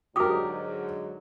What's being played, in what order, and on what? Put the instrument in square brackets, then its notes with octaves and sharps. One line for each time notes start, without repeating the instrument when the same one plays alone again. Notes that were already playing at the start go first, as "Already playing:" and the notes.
[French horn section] G#2 D3 F#3 [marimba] F#4 D6 D#6 [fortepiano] G4 A#4